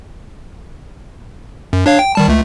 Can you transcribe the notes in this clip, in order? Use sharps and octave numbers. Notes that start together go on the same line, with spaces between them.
F#2
D4 C#5 F5
G5
D#3 G3 A5
C#2 A3